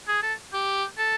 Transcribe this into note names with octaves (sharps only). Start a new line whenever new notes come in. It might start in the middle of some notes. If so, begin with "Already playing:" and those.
G#4
A4
G4
A4